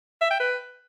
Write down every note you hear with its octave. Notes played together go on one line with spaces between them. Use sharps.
E5
G5
B4